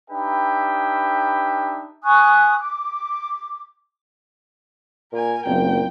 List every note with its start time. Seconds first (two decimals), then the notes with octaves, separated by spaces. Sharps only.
0.10 D4 D#4 G4 B4 E5 G5
2.04 G#5 C#6 D#6 F#6
2.62 D6
5.13 A#2 A#4 G#5
5.46 F#1 A#2 F#3 B3 C4 G5